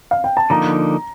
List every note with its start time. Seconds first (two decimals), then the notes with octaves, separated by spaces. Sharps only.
0.11 F5
0.24 G5
0.37 A5
0.50 D3 F3 A#3 D#4 A#5